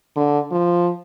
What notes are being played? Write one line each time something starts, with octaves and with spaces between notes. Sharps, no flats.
D3
F3